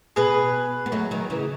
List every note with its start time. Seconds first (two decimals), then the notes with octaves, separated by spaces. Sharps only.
0.16 B2 G#4 B4
0.86 B3
0.92 F#3 A3
1.11 D#3 F#3
1.30 C#3 E3